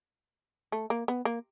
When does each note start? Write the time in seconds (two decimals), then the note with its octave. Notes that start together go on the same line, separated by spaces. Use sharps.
0.72 A3
0.90 A#3
1.08 B3
1.25 A#3